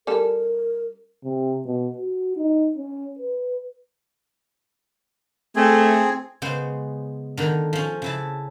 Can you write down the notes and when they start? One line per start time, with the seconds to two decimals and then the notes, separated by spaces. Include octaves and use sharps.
0.07 G3 C#4 A4 A#4
1.24 C3
1.66 B2
1.99 F#4
2.37 D#4
2.77 C#4
3.19 B4
5.56 A3 C4 G#4
6.42 C#3 G#3 B3 C5
7.37 D3 D#3
7.73 F3 C#4
8.02 C#3 E4 A5